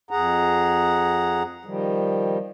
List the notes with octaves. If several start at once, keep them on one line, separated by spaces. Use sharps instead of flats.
F2 G#4 F#5 A#5
D#3 F3 G3